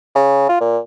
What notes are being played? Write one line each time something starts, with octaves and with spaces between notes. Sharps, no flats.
C#3
F4
A#2